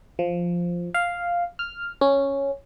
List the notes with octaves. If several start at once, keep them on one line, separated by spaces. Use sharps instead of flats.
F3
F5
F6
C#4